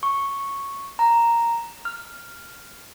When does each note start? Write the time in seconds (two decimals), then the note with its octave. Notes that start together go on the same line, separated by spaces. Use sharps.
0.03 C#6
0.99 A#5
1.85 F6